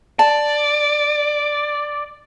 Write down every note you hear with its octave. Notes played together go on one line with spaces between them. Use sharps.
D5 A5